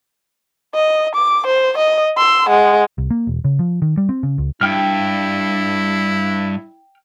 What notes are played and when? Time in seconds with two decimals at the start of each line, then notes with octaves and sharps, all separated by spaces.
0.75 D#5
1.15 D6
1.46 C5
1.78 D#5
2.17 C6 E6
2.49 G#3 F#5
2.98 C2
3.10 A#3
3.27 E1
3.44 C#3
3.59 F3
3.82 D#3
3.97 G3
4.09 C4
4.23 C#3
4.38 C#2
4.61 G2 E4 G5 F6